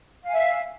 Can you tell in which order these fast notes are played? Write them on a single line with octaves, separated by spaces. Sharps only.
F5 G#5 E5